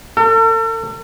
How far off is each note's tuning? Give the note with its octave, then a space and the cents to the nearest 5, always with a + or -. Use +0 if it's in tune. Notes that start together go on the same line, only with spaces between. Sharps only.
A4 +40